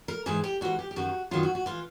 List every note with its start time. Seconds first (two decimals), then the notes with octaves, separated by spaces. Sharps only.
0.08 A#4
0.26 G#2 E3 G#4
0.44 G4
0.61 G#2 E3 F#4
0.79 G4
0.91 G4
0.96 F#2 D#3 F#3 F#4
1.31 F#2 D#3 F#3 F4
1.43 F#4
1.55 F#4
1.66 E3 F4